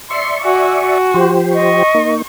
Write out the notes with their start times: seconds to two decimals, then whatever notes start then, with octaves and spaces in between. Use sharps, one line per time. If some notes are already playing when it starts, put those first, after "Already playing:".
0.10 D5 E5 C6 C#6
0.44 F#4 G#5
0.80 F#4
1.14 F3 G4 C5
1.54 D#5 C#6
1.95 A#3 D#4